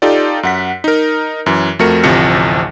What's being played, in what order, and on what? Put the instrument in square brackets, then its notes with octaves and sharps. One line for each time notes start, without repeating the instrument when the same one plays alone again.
[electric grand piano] D#4 F4 G4 A4 D5
F#2 F#5 B6
D#4 A#4
F#2 E3
F2 A3 F#4 A#4 C#7
A1 D2 C3 F3 A#6 C#7